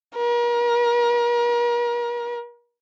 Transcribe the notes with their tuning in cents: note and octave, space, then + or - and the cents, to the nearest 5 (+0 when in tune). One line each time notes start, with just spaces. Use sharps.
A#4 +40